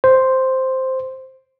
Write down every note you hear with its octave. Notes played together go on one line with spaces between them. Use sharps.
C5